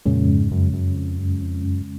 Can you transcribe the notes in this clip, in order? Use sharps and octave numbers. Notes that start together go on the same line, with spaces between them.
F2 A#2 C#3 G#3 C#4
G#2
F#2
F#2
F2
F#2
F2
F#2